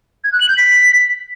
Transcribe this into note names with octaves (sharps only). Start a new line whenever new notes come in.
G#6
F#6
F#7
G6
B6